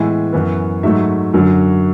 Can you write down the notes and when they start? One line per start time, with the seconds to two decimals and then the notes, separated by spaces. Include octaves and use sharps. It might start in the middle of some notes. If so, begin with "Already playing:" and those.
Already playing: A2 E3 G#3 B3 E5 G#5
0.33 F#2 E3 B3
0.83 G#2 F#3 A3 E5
1.34 F#2 D3 F#3